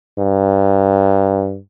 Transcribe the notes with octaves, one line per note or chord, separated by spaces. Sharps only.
G2